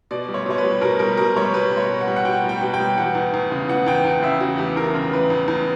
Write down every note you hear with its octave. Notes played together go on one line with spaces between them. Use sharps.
B2 D5
G3
C#5
B2 C#5
B4
G3
B2 A#4
G3 A#4
B2 A#4
G3 C#5
B2 B4
G3
C#5
B2
F#5
G3
F#5
B2 G5
G3 G5
B2
G5
G3
E3 F#5
E2
E2
C#3
E3 F#5
E2 G5
E2 F#5
C#3 E5
E3 F#4
E2 G4
E2 A#4
C#3 A#4
E3 B4
E2
E2